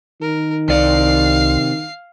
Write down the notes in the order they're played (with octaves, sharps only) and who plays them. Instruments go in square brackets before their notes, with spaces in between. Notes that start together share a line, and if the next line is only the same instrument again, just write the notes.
[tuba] D#3 [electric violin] A#4
[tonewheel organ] C2 [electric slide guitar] C3 D5 [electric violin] F5 C7